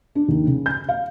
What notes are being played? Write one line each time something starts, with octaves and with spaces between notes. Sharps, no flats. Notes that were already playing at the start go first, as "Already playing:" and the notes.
D4
D#2
C#3
G6
F5